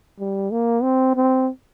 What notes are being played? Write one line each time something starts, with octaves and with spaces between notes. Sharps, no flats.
G3
A#3
C4
C4